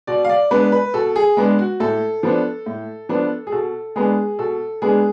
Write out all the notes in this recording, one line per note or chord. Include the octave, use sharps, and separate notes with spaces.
B2 D5
F5
D5
G#3 B3 D4 B4
B4
B2 A4
G#4
G#3 B3 D4
F#4
A2 A4
F3 B3 D4
A2
F3 B3 D4
G#4
B2 A4
G#3 B3 D4 G#4
B2 A4
G#3 B3 D4 G#4